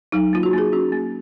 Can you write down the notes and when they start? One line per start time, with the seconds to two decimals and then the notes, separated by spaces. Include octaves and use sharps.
0.12 F#3 D#4
0.33 A#3 F4
0.43 F#4
0.53 A#3
0.58 G#4
0.73 C#4 F#4
0.92 A#3